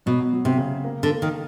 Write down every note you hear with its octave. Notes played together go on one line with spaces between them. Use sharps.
B2 F#3
F#3
C3
C#3
A#3
D3
A#3
D#3